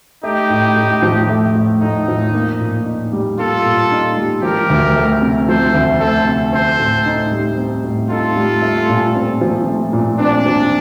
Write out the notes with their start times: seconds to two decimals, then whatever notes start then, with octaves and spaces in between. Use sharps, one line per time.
0.23 A3 D#4 G4
0.50 A2
0.76 A2
1.02 F3
1.29 A3
1.55 A2
1.81 A2 D#4
2.08 F3
2.34 A#3
2.60 A#2
2.85 D#4
3.12 G3
3.39 A#3 F4 A4
3.65 A#2
3.91 D#4
4.17 G3
4.43 F3 G4 A#4
4.70 D2
4.96 A3
5.22 C3
5.48 F3 A4 C5
5.75 D2
6.00 A3 A4 C5
6.27 C3
6.53 C4 A4 C5
6.79 A2
7.06 D#4
7.32 G3
7.58 C4
7.84 A2
8.10 D#4 F4 A4
8.36 G3
8.62 A3
8.89 A#2
9.16 C4
9.41 F3
9.67 A3
9.93 A#2
10.19 C4 D4
10.46 F3